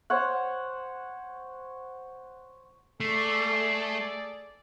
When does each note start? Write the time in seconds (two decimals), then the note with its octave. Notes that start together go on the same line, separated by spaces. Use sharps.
0.10 C5 C#5 F#5
3.00 A3 G#4 A4 D5 C7